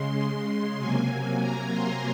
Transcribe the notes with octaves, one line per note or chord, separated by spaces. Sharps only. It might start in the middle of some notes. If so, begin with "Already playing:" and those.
Already playing: C#3 G#3 C6
C3 F#3 A#3 G#5
G#5
A#5
C6